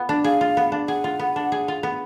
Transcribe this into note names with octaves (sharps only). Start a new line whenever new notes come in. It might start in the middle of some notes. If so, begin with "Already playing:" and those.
Already playing: B3 F4
D4
G#4 F5
F4
B3
D4
G#4 F#5
F4
B3
D4
G#4
F4
B3